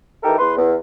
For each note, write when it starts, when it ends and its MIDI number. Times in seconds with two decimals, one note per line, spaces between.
0.24 0.38 52
0.24 0.38 63
0.24 0.38 67
0.24 0.38 69
0.24 0.38 70
0.39 0.57 40
0.39 0.57 71
0.39 0.57 84
0.58 0.74 40